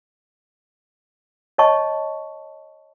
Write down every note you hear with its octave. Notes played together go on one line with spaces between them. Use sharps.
C#5 D#5 A5 C#6